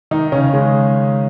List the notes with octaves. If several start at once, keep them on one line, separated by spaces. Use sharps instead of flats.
D#3 D#4
C#3 C#4
G#3